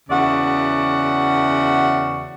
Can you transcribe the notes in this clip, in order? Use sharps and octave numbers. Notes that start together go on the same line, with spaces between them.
E2 C#3 F#4 D5 E5 F#5